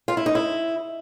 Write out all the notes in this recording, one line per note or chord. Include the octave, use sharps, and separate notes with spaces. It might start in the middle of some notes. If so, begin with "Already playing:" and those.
F4
E4
D#4
E4